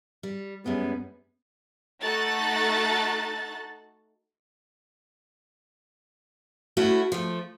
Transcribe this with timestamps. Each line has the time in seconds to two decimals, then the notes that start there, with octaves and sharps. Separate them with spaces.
0.23 G3
0.66 F#2 G3 G#3 B3
2.02 A3 D#4 F#4 A4 F#6 A6
6.77 A3 C#4 E4 F#4
7.12 F3 A3